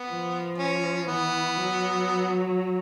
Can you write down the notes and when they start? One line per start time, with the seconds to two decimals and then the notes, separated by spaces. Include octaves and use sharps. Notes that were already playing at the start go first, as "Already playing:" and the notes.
Already playing: B3
0.09 F3
0.58 C#4
1.07 E3 B3
1.57 F#3